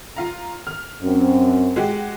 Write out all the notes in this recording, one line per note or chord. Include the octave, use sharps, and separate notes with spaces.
F4 F5 A#5
F6
F#2 C4
G#3 F#4 G4